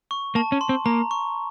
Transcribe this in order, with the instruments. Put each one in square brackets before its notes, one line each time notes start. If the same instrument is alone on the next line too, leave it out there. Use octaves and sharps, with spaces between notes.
[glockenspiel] C#6
[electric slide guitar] A#3 [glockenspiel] A5
[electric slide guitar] C#4
[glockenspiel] C6
[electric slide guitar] C4
[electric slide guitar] A#3 [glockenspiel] A#5
[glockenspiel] C#6